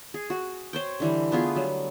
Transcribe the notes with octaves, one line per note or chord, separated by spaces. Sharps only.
G#4
F#4
C5 C#5 G5
D3 E3 G3
A3 B3 F4 G#4
F#3 G3